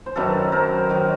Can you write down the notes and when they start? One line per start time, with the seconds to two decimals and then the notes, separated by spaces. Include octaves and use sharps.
0.06 C5
0.16 F#2 D#3 F#3 A4 B4
0.52 A#4 C5
0.89 D#3 F#3